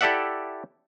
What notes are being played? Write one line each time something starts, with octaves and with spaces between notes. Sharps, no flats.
E4 G4 A4 D5 E5 F#5